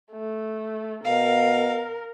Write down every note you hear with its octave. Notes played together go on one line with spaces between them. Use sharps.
A3
B2 A#4 F5